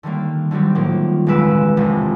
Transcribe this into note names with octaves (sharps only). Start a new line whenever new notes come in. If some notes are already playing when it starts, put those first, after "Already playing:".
D3 D#3 G3 A#3
D3 D#3 F#3 G3 C4
A2 D#3 F3 F#3 A#3
E1 C#2 G#3 B4 E6 D7
F1 C2 C3 F3